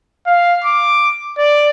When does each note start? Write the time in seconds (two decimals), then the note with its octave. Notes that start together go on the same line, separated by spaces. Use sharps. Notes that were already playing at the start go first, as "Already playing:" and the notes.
0.27 F5
0.64 D6
1.38 D5